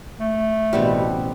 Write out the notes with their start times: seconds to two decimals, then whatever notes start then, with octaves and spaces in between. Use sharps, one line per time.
0.20 A3
0.73 A1 B2 G3 B3 C4